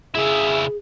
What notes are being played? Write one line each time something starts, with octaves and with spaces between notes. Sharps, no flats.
C#3 E4 G#4 E5